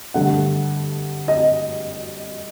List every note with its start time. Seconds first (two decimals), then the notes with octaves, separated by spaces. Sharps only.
0.14 G2 D3 A3 F#5
1.28 D#5